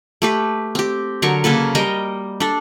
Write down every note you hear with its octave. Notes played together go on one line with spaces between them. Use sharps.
A3 G4 B4
C4 G4
D3 F#3 A#4 C#6
C#3 A#3 A4 B4
G3 A#4 D#5 G5
D4 A4